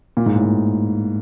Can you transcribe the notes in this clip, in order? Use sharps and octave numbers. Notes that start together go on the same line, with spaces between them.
A#2
G#2
A2
A#2